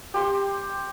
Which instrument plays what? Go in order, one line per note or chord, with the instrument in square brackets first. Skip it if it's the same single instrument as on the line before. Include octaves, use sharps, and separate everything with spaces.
[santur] G4 C6